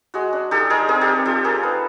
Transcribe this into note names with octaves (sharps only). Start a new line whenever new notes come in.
G#3 F#4
D4
D#4 G4 A4
G#3 G#4 A#4
C4 G#4 A#4
G4 A4
C4
F4 G4 A4
A#3 G#4 A#4
D#4 A4 B4